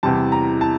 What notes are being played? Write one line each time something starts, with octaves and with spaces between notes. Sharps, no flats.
E2 C3 G3 A5
A#5
A5